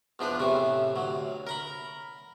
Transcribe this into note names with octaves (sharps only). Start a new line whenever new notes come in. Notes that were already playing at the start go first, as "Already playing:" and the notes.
E2 F3 D4 B4
A2 C3 E3 A3
D2 F#3
A#4 A#5 B5